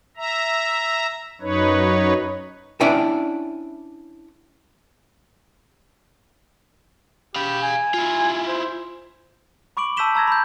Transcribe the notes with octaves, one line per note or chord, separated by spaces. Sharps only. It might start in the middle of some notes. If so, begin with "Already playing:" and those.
E5 A#5
F#2 D#4 B4 C#5
C#4 D4 E4 D5 G5 G#5
G4 F5 B5
G#5
E4 F4
C5
B5 C#6 D6 D7 F#7
A5 E6 G6 B6 E7 G7
A5 A#5 E6 G#6 A#6
B5 G6